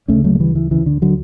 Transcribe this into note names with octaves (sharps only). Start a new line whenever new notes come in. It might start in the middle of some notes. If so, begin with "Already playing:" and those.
D2 C#3 A3 C#4
F#3 A3
A3
E3 G3
E3
D2 C#3 E3
D3
D3 F#3